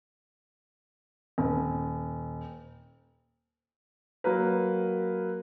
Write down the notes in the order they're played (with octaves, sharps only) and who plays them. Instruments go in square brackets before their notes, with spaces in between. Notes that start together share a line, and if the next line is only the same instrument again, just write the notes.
[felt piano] D#1
[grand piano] F#3 A#3 A#4 B4